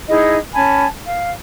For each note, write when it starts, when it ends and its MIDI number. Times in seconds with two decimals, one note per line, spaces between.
0.08 0.36 63
0.08 0.36 64
0.08 0.36 68
0.08 0.36 75
0.54 0.86 61
0.54 0.86 80
0.54 0.86 81
0.54 0.86 83
1.05 1.31 77